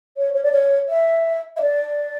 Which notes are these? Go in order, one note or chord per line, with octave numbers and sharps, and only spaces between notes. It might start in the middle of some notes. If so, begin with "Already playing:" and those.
C#5
C#5
D5
C#5
E5
E5
D5